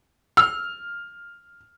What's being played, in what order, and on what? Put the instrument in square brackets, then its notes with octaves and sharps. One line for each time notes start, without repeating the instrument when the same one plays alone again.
[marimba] E6 [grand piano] F6